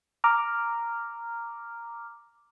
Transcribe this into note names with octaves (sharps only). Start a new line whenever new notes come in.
A#5 D6 F6